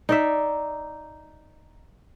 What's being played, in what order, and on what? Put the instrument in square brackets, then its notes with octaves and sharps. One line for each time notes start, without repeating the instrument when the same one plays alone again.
[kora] D#4 D5 E5